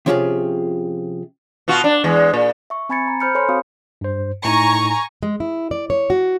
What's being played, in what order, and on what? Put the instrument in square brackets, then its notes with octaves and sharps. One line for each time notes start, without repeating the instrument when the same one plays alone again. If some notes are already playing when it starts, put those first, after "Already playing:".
[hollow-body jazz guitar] C3 F3 C#4 F4 G4 G#4
[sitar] B2 F4 F#4
D4
E2 G#3
A#2
[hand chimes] E5 C#6
C4 G#5 B5 G#6 A6 C#7
A#5
C5 B5 F6 G6 C#7
A4 C#5 G#5 B5 C6
C4 F#4 A4 F5 D#6
[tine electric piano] G2 C5
[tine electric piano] A2 D#4 [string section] G#5 A#5 C#6
[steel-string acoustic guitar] G#3
E4
D5
C#5
F#4